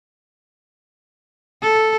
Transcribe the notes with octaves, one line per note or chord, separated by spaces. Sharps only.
A4